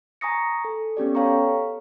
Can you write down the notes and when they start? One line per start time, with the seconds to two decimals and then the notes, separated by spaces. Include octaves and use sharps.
0.21 G#5 A#5 C#6 D#6 A#6 C#7
0.65 A4
0.97 B3 C#4 G4 D5
1.15 A4 C#5 F5 G5 A#5 C#6